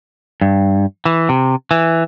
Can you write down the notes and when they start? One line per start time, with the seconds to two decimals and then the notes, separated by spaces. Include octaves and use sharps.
0.41 G2
1.05 E3
1.29 C3
1.71 E3